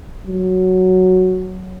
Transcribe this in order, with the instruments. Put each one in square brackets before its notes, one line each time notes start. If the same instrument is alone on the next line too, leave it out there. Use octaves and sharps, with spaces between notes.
[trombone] F#3